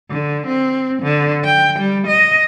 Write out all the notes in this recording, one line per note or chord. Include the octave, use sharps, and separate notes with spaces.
D3
C4
D3
G5
G3
D#5